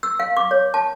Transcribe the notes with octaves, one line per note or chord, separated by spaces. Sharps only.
E6
F5
D6
C#5
A5